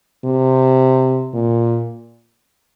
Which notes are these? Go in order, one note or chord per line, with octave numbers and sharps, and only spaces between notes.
C3
A#2